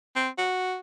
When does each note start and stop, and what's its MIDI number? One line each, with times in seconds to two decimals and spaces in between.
0.16 0.29 60
0.38 0.77 66